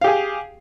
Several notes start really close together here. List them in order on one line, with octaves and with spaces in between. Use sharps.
F5 G4 G#4